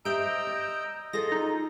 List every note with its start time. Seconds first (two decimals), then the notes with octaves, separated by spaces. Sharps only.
0.05 G4 C5 D#5 E5 A#5 E6 G6 D7
0.47 D5
1.13 F4 G#4 A4 D#5 A#6
1.32 D#4